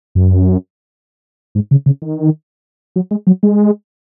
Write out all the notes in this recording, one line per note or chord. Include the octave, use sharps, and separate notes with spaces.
F#2
G#2
C#3
C#3
D#3
F#3
G#3
F#3
G#3